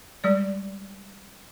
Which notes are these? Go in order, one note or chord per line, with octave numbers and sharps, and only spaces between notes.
G3 G#3 D5